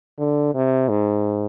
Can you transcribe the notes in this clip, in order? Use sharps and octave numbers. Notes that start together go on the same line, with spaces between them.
D3
C3
G#2